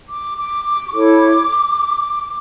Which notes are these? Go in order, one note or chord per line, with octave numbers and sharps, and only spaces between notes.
D6
D6
D6
C#6
E4 A4 C#5 D6